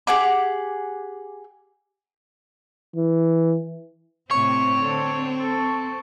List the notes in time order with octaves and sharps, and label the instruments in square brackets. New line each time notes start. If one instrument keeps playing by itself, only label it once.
[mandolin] G4 G#4 F#5 D6
[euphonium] E3
[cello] A2 C3 [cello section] C4 [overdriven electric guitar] C#5 [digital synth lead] C#6
[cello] D3 A4
A4